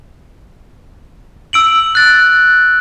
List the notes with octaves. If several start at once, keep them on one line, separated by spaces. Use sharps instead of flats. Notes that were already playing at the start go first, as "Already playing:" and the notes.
E6 D7 F#7
F#6 A6